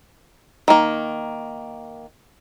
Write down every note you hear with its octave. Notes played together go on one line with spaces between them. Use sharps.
D#3 A#3